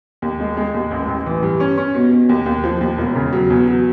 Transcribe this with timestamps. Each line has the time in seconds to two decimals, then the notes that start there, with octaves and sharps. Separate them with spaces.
0.22 D#2
0.40 G#3
0.57 G#3
0.74 D#2
0.91 A1
1.08 A1
1.26 E3
1.43 G2
1.60 C#4
1.78 C#4
1.95 B2
2.12 B2
2.29 D#2
2.46 D#2
2.64 F3
2.81 D#2
2.98 E1
3.15 C#3
3.33 F#3
3.50 E2
3.67 F#3